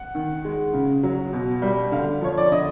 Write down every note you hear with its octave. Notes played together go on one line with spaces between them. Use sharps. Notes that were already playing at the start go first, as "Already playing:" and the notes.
Already playing: F#5
D#3
G#3
C#3
F#3
B2
G3
D3 F5
F3 C#5
D5
D3 D#5